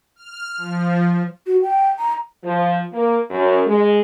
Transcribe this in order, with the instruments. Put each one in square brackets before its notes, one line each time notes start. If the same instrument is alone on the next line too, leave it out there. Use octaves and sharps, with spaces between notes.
[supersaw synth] F6
F3
[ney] F#4
G5
A#5
[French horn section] F3
A#3
F#2
G#3